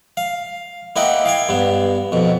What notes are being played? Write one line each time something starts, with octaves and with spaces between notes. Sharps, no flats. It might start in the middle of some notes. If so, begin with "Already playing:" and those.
F5
A#3 E4 D#5 F#5 G5
F5 G5 G#5
G2 B3
F2 B2